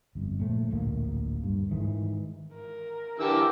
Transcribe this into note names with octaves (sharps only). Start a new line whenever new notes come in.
G1 F2
A#2 F3 A3
D1 A#1 A#3
G2
G#2 D#3 E3
A#4
D3 E3 G4 A#4 G5 E6